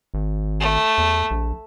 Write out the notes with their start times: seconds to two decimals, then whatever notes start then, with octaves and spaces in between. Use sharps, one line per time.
0.14 G#1
0.60 A3
0.98 E2
1.31 A#1